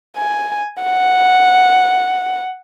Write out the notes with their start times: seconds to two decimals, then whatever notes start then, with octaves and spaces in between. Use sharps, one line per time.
0.17 G#5
0.83 F#5